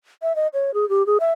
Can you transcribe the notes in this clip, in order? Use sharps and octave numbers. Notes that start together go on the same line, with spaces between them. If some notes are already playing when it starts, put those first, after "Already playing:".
E5
D#5
C#5
G#4
G4
G#4
E5